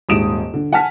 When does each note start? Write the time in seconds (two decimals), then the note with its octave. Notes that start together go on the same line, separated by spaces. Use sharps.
0.09 D#1 G#2 D#6 D7 E7
0.54 D3
0.73 F#5 G#5 A5 F6 B6